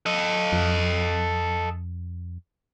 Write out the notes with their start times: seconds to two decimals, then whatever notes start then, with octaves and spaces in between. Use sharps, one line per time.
0.06 A4 D#5
0.52 F2